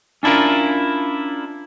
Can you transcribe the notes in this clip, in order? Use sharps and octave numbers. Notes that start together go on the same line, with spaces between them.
C#4 D4 E4 F4 A#4